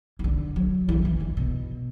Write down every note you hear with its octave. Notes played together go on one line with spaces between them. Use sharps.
E3
D3
F#3
E3
E3
D3
B2